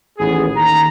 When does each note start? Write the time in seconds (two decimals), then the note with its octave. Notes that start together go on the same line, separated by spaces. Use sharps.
0.19 A1 D#2 B3 G#4
0.57 D#2 D#3 A#5